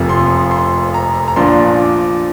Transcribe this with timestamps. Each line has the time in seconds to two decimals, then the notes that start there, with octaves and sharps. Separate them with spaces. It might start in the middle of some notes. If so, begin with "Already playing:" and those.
Already playing: F1 F2 F3 A#3
0.09 C6
0.51 C6
0.94 A#5
1.28 A#5
1.36 A#1 A#2 F3 D4 C6
1.79 D6